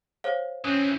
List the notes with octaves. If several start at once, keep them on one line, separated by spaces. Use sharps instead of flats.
C5 C#5 F5
E3 C4 C#4 D#6